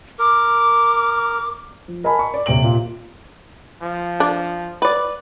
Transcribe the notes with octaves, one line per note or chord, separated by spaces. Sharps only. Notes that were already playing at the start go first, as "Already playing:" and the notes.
A#4 D6
F3
A#4 D#5 G#5 A5 B5
C#6
D5
D#1 C3 G5 D7 F#7
A#2
F3
D4
B4 D5